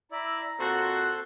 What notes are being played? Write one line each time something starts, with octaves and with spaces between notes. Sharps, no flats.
E4 D5 A#5 E6
A#2 C4 F#4 A4 C5 F#6